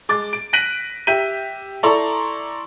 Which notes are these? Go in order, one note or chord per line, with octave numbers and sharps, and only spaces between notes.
G#3 D6 A6
D7
F#6 A#6 B6 D7 D#7 F#7
G4 E5 G6 B6 D#7
E4 A4 D5 A#5 C6 C#6